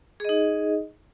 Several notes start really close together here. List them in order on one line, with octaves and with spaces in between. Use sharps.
G#4 D#5 D#4